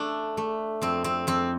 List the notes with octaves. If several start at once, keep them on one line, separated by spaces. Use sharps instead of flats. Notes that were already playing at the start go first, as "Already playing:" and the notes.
Already playing: A3 D4
A3
F2 C4
C4
F2 C4